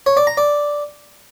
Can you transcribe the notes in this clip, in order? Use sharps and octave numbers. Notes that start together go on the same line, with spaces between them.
C#5
D5
A#5
D5